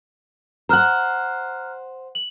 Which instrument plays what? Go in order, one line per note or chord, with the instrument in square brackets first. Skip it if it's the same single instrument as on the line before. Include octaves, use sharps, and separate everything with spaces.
[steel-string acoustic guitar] C5 F#5 [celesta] A#5 F6 F#6
[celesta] F#7